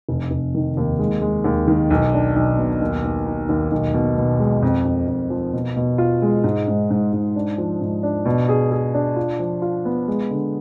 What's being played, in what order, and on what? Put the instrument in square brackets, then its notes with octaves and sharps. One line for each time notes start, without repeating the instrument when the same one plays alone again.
[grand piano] F1
F1
D#3
D#2
G#3
G#3
D#2
D#3
B1
D4
B1
B2
D#2
D#2
D#4
D#2
B1
B2
B2
G#3
F2
F2
F2
F3
B2
B2
F4
G#3
G#2
G#2
G#2
G#2
D4
F3
G#2
D4
B2
G#4
G#4
D4
F4
F3
F4
B3
G#3
D3